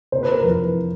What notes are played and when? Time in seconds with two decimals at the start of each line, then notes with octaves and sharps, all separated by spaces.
0.12 C3 C5
0.23 B4
0.28 C3
0.34 A#4
0.44 F2 B4
0.59 E3